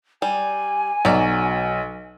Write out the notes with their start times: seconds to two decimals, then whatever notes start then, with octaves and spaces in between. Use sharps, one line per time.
0.22 G3 G#5
1.05 B1 F#3 D5